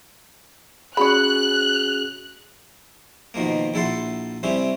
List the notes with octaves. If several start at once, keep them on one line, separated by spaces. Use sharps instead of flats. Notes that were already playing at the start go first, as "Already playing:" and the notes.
C#4 F#4 G#4 C#5 B5 F#6
B2 D#3 F3 A#3
A#1 E4 A4 F#5 C6
C3 G3 C4 C#4 E4